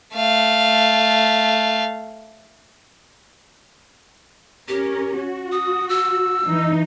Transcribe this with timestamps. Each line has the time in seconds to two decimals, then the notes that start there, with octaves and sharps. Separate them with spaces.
0.15 A3 F5
4.68 C#4 G4 A#4
5.17 F#4
5.52 D#6
5.89 E6
6.46 E3 D#4